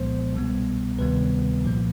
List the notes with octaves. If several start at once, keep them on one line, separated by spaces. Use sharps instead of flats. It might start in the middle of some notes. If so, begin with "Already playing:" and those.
Already playing: C2 A#2 F3 G#3 B3 C5
C2 B2 G3 B3
D2 C3 D#3 G3 B3 B4
C2 A#2 F3 A#3